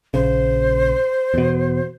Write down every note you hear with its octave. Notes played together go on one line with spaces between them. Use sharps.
A#1 C#3 C5
E2 B2